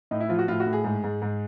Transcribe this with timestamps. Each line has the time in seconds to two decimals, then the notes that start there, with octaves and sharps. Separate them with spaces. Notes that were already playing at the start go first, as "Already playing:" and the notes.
0.11 A2 D#4
0.20 E4
0.29 F3 F4
0.39 F#4
0.48 A2 F4
0.60 F#4
0.66 A2
0.73 G#4
0.84 G#2
1.04 G#2
1.22 G#2